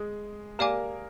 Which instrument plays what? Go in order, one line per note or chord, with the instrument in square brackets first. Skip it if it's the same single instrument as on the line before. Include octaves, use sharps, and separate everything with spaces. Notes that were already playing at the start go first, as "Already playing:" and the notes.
Already playing: [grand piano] G#3 G#4
[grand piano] A#3 A#4 [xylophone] G4 D5 F5 G#5 D6